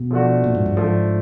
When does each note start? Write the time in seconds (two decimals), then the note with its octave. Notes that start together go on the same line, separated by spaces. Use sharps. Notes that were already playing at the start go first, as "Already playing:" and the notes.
Already playing: B2
0.11 F3 A3 D4 F#4
0.44 A#2
0.55 G#2
0.66 G2
0.76 G#2 F3 A3 D4